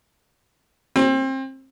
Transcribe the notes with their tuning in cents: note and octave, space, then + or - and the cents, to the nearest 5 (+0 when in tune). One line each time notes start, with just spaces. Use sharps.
C4 +30